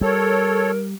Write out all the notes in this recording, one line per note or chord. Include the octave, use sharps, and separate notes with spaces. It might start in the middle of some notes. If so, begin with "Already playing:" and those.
G3 A4 A#4 C#5